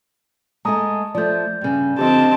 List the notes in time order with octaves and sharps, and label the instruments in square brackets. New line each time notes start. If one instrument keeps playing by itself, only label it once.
[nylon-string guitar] G#3 A3 D#5 [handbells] A5 A#5 D#6
[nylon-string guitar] F3 A3 [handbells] D5 G6
[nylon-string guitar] G2 C#3
[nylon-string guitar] D3 F3 [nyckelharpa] C4 A5 [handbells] G4 D#5